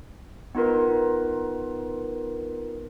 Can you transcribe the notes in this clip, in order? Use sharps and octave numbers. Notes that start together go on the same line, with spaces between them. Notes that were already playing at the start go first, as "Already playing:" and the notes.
B3 D#4 F4 A#4 B4